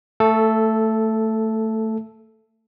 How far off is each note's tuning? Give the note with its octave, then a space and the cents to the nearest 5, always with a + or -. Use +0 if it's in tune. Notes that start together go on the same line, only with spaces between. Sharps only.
A3 +15 A4 -5